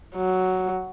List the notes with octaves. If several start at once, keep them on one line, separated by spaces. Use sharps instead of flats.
F#3